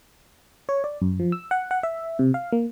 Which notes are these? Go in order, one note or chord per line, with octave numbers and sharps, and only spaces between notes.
C#5
D5
F#2
F3
E6
F#5
F#5
E5
C3
F5
A#3